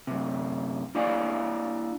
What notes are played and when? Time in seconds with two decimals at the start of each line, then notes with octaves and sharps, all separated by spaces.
0.07 F#2 C3
0.95 A#3 D4 E4 D5 F5 G#5